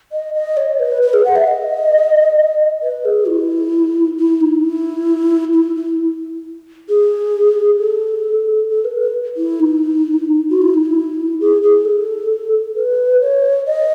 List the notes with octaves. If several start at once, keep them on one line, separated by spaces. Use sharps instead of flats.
D#5
D#5
C#5
B4
B4
G#4
F#5
E5
D#5
B4
G#4
E4
E4
D#4
E4
E4
E4
G#4
A4
A4
B4
B4
E4
D#4
F#4
E4
D#4
E4
G#4
G#4
A4
B4
C#5
D#5